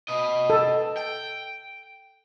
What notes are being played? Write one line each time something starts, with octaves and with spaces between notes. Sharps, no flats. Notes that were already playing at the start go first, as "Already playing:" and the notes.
B4 D#5
A4
G5